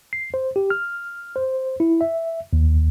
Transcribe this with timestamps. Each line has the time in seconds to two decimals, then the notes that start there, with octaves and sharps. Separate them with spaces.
0.13 C7
0.34 C5
0.56 G4
0.70 F6
1.36 C5
1.80 E4
2.01 E5
2.53 D#2